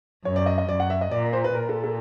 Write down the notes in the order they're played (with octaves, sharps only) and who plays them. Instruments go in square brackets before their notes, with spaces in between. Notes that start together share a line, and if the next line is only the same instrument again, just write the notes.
[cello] F#2 [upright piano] C#5
[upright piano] D5
D#5
D#5
[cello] F#2 [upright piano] D5
[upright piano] F#5
E5
D#5
[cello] A#2 [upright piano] D5
[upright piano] C5
B4
[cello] A#2 [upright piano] A#4
[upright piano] A4
A4